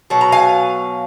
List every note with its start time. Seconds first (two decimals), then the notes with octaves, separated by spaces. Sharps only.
0.10 B2 F#3
0.21 A#5
0.32 F5 G#5